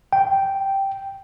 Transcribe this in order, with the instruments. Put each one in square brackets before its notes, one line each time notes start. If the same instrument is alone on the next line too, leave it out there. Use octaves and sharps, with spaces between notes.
[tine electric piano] G5